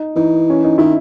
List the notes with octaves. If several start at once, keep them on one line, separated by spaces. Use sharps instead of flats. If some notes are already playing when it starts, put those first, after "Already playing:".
Already playing: D#4
E3 D#4
C#4
D#4
D#3 E4